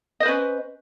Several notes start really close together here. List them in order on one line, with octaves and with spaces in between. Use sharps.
D#5 C5 B4 C#4